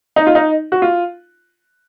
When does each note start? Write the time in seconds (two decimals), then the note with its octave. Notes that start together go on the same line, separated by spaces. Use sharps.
0.16 D#4
0.27 F4
0.35 D#4
0.72 F#4
0.82 F4